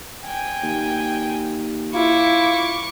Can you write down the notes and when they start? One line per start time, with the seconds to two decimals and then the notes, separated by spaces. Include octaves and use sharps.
0.25 G5 G#5
0.63 D#2
1.94 E4 F4 C#6 D6